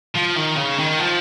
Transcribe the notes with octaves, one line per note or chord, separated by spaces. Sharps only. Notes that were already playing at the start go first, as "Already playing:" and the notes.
F3
D#3
C#3
D#3
F3